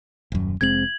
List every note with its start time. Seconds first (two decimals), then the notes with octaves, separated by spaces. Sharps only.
0.32 D#1 F#2
0.61 F1 G#3 C4 G#6 F#7